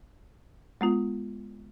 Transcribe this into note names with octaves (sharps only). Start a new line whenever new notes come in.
G#3 B3 F4